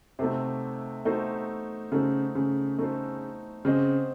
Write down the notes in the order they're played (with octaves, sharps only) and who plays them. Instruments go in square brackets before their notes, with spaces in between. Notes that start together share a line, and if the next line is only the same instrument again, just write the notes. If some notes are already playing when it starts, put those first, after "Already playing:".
[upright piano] C3 [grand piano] A3 D#4 F#4 A4 C5
[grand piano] A3 D#4 F#4 A4 C5
[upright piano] C#3 [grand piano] A3 D#4 F#4 A4 C5
[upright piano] C#3
[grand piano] A3 D#4 F#4 A4 C5
[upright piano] C#3 [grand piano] C4 F#4 C5 D#5